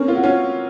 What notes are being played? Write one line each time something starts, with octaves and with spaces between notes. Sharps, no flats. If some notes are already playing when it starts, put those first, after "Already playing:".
Already playing: A#3 C4 C#4
F4
F#4
C#4 F4